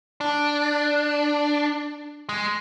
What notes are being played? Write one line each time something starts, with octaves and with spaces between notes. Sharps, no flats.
D4
G#3